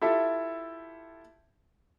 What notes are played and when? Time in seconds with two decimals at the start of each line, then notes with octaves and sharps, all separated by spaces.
0.02 E4 F4 G4 A4 E5